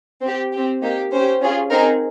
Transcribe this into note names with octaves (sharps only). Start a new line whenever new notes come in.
C4 G4
C4 G4
A#3 D#4 G4
C#4 G4 C5
C#4 F4 G#4
C4 D#4 G#4 A#4